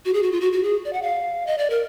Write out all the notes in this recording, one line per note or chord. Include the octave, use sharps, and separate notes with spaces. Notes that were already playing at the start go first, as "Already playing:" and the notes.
F#4
G#4
F#4
F4
F#4
F#4
G#4
D5
F#5
F5
D#5
D5
A#4